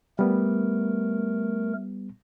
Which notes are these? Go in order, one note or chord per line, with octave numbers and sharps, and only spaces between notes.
G3 A3 B3 A#4